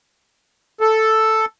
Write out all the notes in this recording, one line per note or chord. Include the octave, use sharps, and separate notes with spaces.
A4